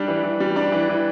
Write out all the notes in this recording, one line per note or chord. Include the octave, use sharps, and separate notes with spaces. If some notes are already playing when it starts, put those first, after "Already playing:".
Already playing: G3 D4
E3
E3
G3
D4
E3
E3